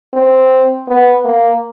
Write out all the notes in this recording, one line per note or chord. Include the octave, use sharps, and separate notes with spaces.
C4
B3
A#3